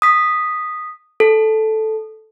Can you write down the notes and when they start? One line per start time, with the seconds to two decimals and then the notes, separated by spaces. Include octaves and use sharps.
0.02 D#6 B6
1.20 A4